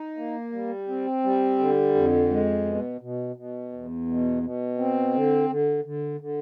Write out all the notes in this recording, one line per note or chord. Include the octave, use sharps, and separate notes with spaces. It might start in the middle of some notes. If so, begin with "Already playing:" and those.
Already playing: D#4
A#3
G3
C4
G3
D3
F2
G#3
B2
B2
B2
E2
B2
B2
C4
D3
D3
D3
D3